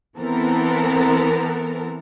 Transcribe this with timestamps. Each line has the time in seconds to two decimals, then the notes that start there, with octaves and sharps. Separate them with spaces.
0.17 E3 B3 C4 A4 A#4